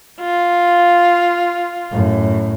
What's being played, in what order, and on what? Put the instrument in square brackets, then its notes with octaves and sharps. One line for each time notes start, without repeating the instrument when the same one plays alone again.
[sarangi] F4
[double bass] F#2 A2